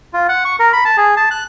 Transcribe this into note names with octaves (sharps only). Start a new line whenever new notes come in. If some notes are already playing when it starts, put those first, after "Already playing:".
F4
F#5
C#6
A#4
B5
A5
G#4
A5
F#6